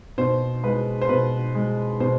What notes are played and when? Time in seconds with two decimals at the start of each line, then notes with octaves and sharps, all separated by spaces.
0.18 B2 C5
0.63 G#3 B4
1.01 C5
1.09 B2 B4
1.55 G#3
2.00 B2 C5